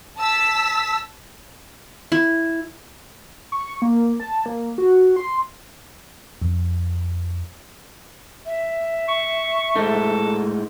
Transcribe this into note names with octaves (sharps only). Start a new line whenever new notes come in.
A5 E6 B6
E4
C#6
A#3
A5
A#3
F#4
C6
F2
E5
C#6
A2 G#3 D#4 A4